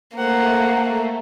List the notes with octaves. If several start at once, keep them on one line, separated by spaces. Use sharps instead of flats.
A3 A#3 C5 F#5